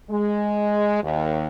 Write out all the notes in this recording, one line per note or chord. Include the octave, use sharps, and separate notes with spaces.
G#3
D#2